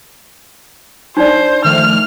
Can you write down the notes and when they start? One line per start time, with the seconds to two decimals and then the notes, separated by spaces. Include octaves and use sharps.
1.17 D4 D#4 C5 D5
1.64 D#3 F3 A3 F6